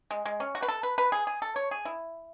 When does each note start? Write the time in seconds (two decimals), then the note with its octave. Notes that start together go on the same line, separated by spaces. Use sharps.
0.11 G#3
0.26 G#3
0.40 C#4
0.55 F#4
0.63 B4
0.68 A4
0.83 B4
0.98 B4
1.12 G#4
1.27 G#4
1.42 A4
1.56 C#5
1.71 G#4
1.85 E4